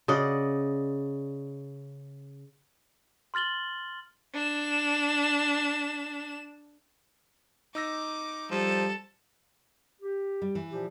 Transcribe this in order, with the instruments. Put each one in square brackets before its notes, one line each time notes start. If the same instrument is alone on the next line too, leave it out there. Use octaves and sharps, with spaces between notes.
[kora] C#3 D5 D#5 F#5
[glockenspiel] C6 F6 A6 F#7 G7
[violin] D4 E7
[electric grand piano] D#4 E6 A#6 [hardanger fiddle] D6
[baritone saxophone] F3 [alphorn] G3 [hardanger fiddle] A4
[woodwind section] G4
[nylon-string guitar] G3
E3
[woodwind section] A#2 F3 G4